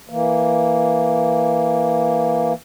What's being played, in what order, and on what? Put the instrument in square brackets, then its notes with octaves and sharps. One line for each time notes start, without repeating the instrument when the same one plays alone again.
[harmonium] E3 A#3